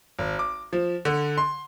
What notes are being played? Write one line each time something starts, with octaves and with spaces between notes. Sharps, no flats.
G#1
D6
F3
D3
C6